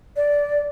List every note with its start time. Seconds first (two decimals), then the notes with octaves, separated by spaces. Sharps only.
0.16 D5